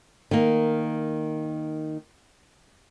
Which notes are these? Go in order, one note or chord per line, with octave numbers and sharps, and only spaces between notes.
D#3 A#3